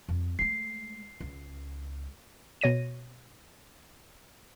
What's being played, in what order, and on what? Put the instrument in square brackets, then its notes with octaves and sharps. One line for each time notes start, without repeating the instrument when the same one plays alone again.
[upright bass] F2
[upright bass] G#3 A3 [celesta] C7
[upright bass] C#2
[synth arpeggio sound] B2 C#5 A#6 D#7